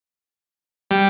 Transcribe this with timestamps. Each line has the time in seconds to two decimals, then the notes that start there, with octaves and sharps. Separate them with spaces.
0.91 G3